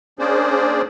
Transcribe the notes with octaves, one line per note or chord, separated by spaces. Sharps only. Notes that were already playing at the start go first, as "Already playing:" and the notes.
A#3 C#4 D4 G#4 C5 D5